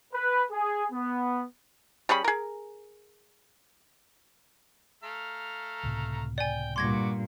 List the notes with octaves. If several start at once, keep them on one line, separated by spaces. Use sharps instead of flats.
B4
G#4
B3
G3 C#4 G#4 B5
G#4 A#4
A3 F5 A#5
C#2 A2 C3
D5 G5 G#5
G2 A#2 F#4 C6 D6 G#6 A#6